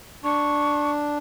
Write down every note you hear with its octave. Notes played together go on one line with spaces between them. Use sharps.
D4 C#6